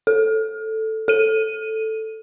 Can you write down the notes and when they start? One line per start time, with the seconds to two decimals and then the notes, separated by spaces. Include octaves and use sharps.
0.07 A4
1.08 A4 D#7